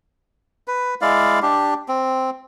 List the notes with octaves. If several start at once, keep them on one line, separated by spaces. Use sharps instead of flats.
B4
G#3 E4 D5 F5
D4 G4
C4